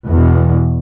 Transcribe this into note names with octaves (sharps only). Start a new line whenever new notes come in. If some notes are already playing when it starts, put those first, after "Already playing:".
E2 B2